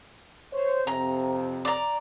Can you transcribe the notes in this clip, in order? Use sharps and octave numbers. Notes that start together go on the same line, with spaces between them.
C5 C#5
F2 C3 A#5
D5 A#5